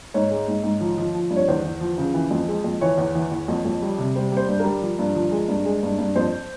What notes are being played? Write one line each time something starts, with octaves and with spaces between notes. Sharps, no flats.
G#2 C#5
G#3
G#2
G#2
F3
F3
F3
G2
C#5
E2 C5
E2
F3
C#3
E3
F2
G#3
F2
E3 C#5
E2
E3
E2
F2
F2
G3
C3
G3 C5
G3 C5
G2
G3 A#4
F3
G2
F3
G#3
G2
G#3
G2
G2
F2 C5